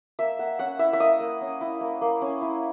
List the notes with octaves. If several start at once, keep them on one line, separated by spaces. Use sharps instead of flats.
A#3 E5
A#3 F#5
C#4 F#5
E4 E5
E5
A#3 D#5
A#3
C#4
E4
A#3
A#3
C#4
E4